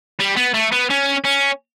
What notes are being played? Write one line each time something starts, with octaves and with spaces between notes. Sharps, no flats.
G3
B3
A3
B3
C#4
C#4